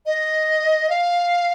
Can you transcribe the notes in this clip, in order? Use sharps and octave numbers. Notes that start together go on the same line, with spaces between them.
D#5
F5